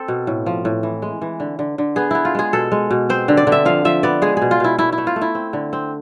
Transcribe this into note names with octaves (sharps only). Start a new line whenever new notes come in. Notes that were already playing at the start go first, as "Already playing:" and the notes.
Already playing: C4 A4
B2
A2
F3
A2
E3
G#3
E3
D3
D3
D3
B3 G#4
B3 E4
F4
G#3 G#4
B2 A4
G#3
B2
C4 C5
D3
D5
D3
E5
F3 F5
F3 E5
B3 D5
G#3 G#4
B2 G#4
F4
B2 E4
A3 E4
E4
A3
F4
A3
E4
C4
D3
C4